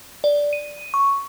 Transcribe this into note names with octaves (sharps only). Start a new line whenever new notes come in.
D5
D#7
C#6